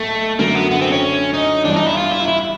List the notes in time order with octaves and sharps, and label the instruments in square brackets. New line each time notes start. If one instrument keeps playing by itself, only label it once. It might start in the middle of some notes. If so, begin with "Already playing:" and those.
Already playing: [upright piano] B1 A2 [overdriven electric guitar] A3
[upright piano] F#2 D3 F#3 A3 [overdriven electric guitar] A#3
[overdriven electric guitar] B3
B3
C4
C#4
D#4
[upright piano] G1 G2 E3 [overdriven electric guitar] D4
[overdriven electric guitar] D#4
E4
F4
E4
E4